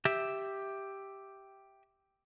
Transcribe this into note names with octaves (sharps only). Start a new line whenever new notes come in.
G4 E5